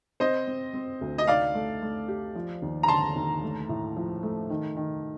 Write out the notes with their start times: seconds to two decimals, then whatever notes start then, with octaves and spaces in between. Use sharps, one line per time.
0.20 C4 C5 D#5
0.47 C4
0.74 C4
1.01 D2
1.18 D#5
1.27 D#4 D5 F5
1.55 A3
1.82 A3
2.08 G4
2.35 F3
2.62 D#2
2.83 A#5
2.88 D3 A5 C6
3.16 D#2
3.43 A3
3.69 A2
3.96 F3
4.23 A3
4.50 D#3
4.77 D#3